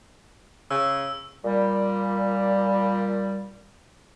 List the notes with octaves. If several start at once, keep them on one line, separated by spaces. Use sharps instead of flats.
C#3 E6
A#2 G3